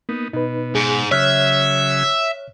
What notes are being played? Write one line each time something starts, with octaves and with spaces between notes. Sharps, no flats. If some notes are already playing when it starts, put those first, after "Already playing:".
A#3 B3 D#4
B2 D#4 B4
G#2 G#4
C#3 F#3 G#4 C#5 E5 F6 F#6